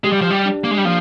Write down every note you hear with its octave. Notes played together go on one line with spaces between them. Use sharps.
G#3 G4
G3
F3
G3
D4
A#3
G#3
G3
F3 A#3